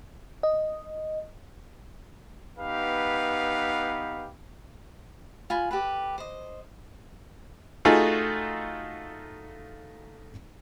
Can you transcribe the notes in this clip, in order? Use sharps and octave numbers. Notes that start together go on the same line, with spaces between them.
D#5
B3 D#4 G4 B4 F5
F4 G#5 B5
G4 A4 B4
C5 D#5
A3 D#4 F4 F#4 G#4 A4